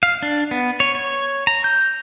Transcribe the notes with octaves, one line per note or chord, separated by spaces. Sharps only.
F5
D4
B3
C#5
C#5
A#5
G6